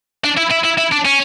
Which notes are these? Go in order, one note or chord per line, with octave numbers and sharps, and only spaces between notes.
D4
E4
E4
E4
E4
D4
C#4